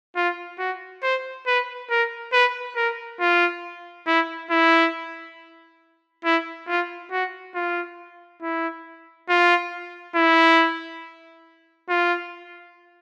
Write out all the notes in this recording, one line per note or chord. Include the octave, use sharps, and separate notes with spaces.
F4
F#4
C5
B4
A#4
B4
A#4
F4
E4
E4
E4
F4
F#4
F4
E4
F4
E4
F4